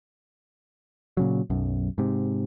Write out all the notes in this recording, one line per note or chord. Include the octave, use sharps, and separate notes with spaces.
A#2 C#3 F#3
B1 F#2
G#2 C3